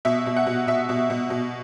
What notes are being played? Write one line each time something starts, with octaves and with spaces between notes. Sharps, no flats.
B2 E5
B2
F#5
B2
B2 E5
B2
B2
B2